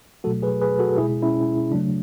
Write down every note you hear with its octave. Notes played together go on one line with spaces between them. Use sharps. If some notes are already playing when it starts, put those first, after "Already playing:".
B2 F#3 A3 F#4 A4
G#4 B4
G#4 B4
F#4 A4
B2 G#3 E4 G#4
C#4 E4
C#3 F#3 A3 D4